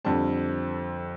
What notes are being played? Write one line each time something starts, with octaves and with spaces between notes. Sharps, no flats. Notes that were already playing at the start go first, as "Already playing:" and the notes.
F2 D3 G3 C4 A5